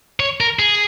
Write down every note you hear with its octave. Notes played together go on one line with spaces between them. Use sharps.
C#5
A#4
G#4